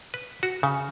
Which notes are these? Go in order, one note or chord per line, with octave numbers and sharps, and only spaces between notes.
B4
F#4
C#3